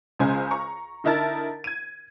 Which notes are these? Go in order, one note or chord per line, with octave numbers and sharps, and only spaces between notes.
C#2 C#3 G#3 C5 G#5
A#5 C#6
D3 D#4 E4 A#4 A5 A6
G#6 D#7